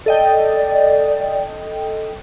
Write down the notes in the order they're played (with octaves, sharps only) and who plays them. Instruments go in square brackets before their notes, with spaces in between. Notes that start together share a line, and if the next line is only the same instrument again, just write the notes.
[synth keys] A4 D#5 G5 [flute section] D5